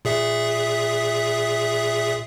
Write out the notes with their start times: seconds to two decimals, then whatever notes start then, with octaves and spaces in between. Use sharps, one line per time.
0.05 A#2 G#4 E5